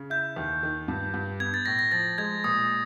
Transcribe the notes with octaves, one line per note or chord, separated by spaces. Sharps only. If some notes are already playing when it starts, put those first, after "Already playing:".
Already playing: C#3
E4 G6
D#2
D#3
G2
G2
B3 G#6
A6
A2 A#6
A#6
F3 A6
G#3 G#6
A#2 D#6